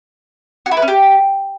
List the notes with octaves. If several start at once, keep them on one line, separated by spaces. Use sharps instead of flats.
F#4
E4
B4
C#4
G4